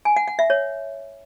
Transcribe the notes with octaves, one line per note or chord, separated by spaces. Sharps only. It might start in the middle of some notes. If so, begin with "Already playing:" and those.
G#5
F#5
F#5
E5
C#5